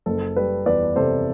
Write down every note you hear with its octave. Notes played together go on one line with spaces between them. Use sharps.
F#1 A4
G3 B4
E2 B4 D5
C3 A4 C5